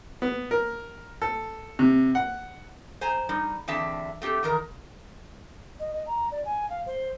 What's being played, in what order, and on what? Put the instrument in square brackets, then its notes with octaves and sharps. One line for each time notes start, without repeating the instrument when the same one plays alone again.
[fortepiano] B3
A#4
A4
C3
F#5
[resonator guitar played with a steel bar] C5 G#5 A#5
G3 D#4
E2 D3 C4 E5 A5
A3 C4 G4 A4
E2 D#3 A#4 A#5
[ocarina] D#5
D#5
A#5
D5
G#5
F5
C5